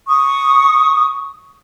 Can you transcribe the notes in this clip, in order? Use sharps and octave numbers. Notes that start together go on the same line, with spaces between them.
C#6 D#6